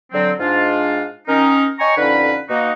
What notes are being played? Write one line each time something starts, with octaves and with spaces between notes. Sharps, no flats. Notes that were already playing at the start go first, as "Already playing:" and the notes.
D3 F#3 C4
G#2 D4 F4
D#3 C#4 D#4 A#4
C#5 D#5 G5 G#5 A#5 C#6
F2 D3 C#4 D#4 B4
B2 A#3 D#4 F#4